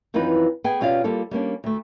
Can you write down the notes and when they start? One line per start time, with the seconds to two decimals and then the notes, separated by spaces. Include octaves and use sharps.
0.14 F#2 E3 F3 C4 D#4 B4
0.64 B3 G#4 G5 G#5
0.81 B2 C#4 F4 G4 D5 F5
1.04 G3 A#3 F4 A4
1.31 G3 A#3 C#4 D4
1.64 D2 A3